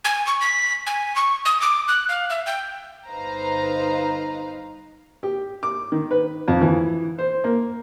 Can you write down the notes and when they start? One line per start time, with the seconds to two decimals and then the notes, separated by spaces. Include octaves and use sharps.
0.05 G#5
0.27 C#6
0.41 B6
0.87 G#5
1.16 C#6
1.45 D#6
1.61 D6
1.88 F#6
2.09 F5
2.30 E5
2.46 G5
3.08 G1 D#4 B4 C5 F5 A#5
5.23 G4
5.63 D6
5.92 D#3
6.11 B4
6.48 F2
6.61 E3
7.19 C5
7.44 A#3